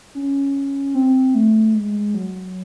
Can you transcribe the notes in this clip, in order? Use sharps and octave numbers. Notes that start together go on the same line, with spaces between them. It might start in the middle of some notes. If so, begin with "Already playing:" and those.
C#4
C4
A3
G#3
F#3